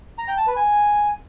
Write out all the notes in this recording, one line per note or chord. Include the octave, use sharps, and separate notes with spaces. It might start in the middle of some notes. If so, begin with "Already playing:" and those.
A#5
G5
A5
B4
G#5